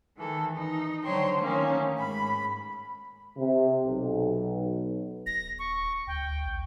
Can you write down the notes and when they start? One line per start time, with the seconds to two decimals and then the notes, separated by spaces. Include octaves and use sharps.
0.16 D#3 E3 A4
0.55 D#4
1.03 D3 F#3 C5 C#5 G5 A#5
1.37 D#3 A3 A#3 C#4 D#4
1.95 G#2 B5
3.36 C3
3.85 B1
5.26 D#1 A#6
5.59 C#6
6.07 D2 G5
6.45 A#1